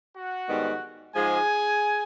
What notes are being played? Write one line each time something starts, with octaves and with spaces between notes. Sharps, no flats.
F#4 F#5
G#2 D#3 G3 B3
G#2 F3 G#3 G#4 G#5